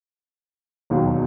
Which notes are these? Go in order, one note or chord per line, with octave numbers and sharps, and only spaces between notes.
E1 D#2 D#3 F#3